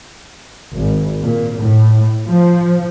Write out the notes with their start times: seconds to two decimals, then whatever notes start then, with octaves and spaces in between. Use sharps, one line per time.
0.73 G#1
1.23 A#2
1.61 A2
2.26 F3